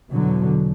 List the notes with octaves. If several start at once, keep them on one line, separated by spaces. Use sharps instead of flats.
E2 B2 D3 F#3